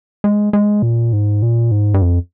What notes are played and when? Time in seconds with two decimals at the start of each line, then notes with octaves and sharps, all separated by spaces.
0.24 G#3
0.53 G#3
0.82 A#2
1.13 G#2
1.42 A#2
1.71 G#2
1.94 G2
2.02 F2